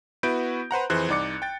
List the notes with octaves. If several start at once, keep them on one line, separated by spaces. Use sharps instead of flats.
B3 E4 F#4 B4 G6 D7
B4 C5 F#5 A#5
F2 E3 G#4 C5 F#6
C2 D#4 D5 D6 C#7
G5 A6